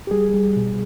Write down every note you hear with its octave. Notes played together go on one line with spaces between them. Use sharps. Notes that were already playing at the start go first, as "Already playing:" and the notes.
G4
G3 G#4
G3
B2